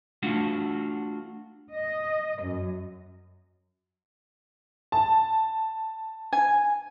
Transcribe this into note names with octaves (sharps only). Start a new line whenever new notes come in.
A3 D4 F4 F#4
D#5
F#2
A5
G#5